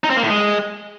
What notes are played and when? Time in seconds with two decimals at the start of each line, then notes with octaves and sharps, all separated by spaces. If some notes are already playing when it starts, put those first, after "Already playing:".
0.04 D#4
0.10 C4
0.17 A#3
0.23 A2
0.29 G#3